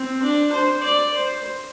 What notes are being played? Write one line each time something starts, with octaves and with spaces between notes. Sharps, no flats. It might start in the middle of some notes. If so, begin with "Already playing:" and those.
Already playing: C4
D4
C5
D5
C5